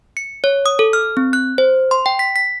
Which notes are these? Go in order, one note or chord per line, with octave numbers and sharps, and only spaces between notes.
C#7
C#5
D#6
A4
F6
C4
F#6
C5
C6
G5
B6
B6